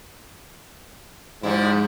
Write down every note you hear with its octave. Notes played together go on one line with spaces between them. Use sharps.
G#2 F3 G3 E4